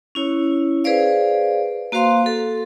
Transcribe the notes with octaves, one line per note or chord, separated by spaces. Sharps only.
C#4 E4 C#5
G#4 B4 C5 D5 F5
A#3 F#4 C5 F5 C6
A4